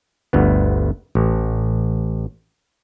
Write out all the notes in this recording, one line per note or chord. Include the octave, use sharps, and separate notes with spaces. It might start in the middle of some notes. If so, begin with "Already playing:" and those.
G1 D2 B3
A1